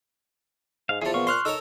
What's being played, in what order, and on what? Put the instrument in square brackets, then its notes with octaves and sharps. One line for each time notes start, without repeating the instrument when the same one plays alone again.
[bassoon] G#2 [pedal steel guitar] F5
[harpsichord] E2 F3 [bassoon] E4 [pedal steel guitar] G#4 A4
[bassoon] A#2 [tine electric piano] B3 F5 [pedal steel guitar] C#6
[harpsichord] C5 [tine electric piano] C6 F6 F#6
[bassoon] D#4 [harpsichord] A4 A#4 C#5 [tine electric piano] E6